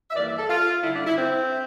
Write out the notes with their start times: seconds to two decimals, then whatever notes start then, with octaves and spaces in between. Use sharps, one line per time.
0.11 E5
0.15 G2 E3 A#3 D5
0.26 E5
0.38 A4
0.49 F4
0.82 G2 D3 G3 E4
0.94 D4
1.06 E4
1.16 C4